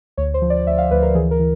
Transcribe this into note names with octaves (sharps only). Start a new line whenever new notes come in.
D2 C#5
C5
F3
D5
D2 E5
F5
D2 B4
A#4
E3 G#4
A#4
E3